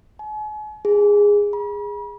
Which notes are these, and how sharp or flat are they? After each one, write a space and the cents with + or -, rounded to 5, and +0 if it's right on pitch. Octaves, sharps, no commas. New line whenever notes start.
G#5 +40
G#4 -15
B5 -40